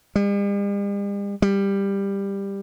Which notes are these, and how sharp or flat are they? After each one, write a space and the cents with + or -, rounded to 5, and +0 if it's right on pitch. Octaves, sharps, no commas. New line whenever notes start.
G3 +45
G3 +15